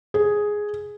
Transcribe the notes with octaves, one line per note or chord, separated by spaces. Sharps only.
G#4